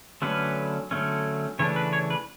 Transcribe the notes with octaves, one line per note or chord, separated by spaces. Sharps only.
D3 F#3 A3 C#4 B4
D3 F#3 A3 C#4
C#3 E3 A3 D4 C#5
B4
C#5
B4